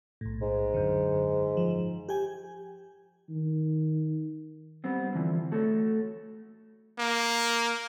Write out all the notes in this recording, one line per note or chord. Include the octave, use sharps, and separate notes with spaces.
B1 A2
G#2
F#2 D3
F3
G4 G5 G#5
D#3
G3 B3 C4
D3 E3 F3 C4
A3 F#4 A4 C#5
A#3